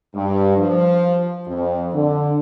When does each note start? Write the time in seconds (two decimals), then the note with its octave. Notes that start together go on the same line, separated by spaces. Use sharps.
0.14 G2
0.58 F3
1.46 F2
1.94 D3